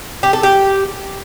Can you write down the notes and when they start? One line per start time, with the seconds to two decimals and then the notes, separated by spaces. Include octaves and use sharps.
0.23 G4
0.33 A4
0.43 G4